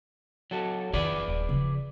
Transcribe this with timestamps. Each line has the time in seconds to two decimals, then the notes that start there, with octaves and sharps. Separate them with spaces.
0.51 F#3 A4
0.93 F2 D#3 G#4 B4 D5
1.28 D#1
1.49 C#3 F3